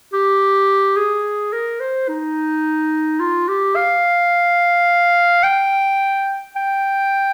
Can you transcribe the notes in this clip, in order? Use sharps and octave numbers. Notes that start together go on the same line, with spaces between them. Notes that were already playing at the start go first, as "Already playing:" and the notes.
G4
G#4
A#4
C5
D#4
F4
G4
F5
G5
G5